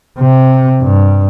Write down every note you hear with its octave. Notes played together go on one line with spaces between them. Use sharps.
C3
G2